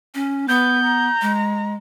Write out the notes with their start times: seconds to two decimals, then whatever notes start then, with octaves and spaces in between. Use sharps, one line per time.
0.15 C#4
0.48 B3 B4 G6
0.84 A#5
1.22 G#3